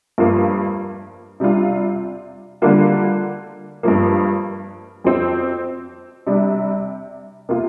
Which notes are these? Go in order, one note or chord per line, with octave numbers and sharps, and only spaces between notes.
G2 F3 A#3 F4
C3 G3 D4 F4
D3 G3 A#3 F4
G2 F3 A#3
F2 F3 C4
C3 G3 D4
C3 A#3 F4